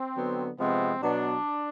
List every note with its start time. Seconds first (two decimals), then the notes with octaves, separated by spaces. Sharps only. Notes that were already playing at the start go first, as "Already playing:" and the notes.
Already playing: C4
0.17 D3 F#3 B3
0.60 C3 F3 G#3 B3 C4
1.03 B2 F#3 B3 D4